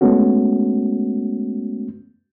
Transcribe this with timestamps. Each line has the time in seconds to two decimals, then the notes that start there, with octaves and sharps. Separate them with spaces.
0.01 G#3 A3 B3 C#4 F#4